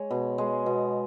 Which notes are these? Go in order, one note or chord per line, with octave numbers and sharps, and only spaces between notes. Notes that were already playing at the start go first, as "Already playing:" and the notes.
Already playing: G#3 C#5
B2
G#3
B2